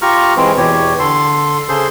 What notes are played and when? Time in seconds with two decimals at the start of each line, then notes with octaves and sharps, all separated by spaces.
0.02 F4 G4 A#5 C#6 F6
0.37 E3 G#3 C4
0.57 E2 B2 E3 G4 C#5
0.99 D3 A4 C6
1.69 C#3 G#4 A4 C5 C6